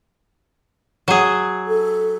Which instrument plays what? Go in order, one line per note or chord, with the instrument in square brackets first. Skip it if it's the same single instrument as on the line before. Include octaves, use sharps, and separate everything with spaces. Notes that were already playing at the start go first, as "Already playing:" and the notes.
[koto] F#3 G#4
[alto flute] A4